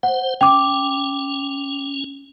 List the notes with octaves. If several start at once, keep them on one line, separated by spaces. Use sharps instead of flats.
C5 F#5
C#4 G5 D6